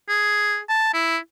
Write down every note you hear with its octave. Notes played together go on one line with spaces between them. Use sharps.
G#4
A5
E4